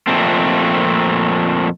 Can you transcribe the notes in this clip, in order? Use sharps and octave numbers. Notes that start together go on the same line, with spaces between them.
F2 A#2 A3 C4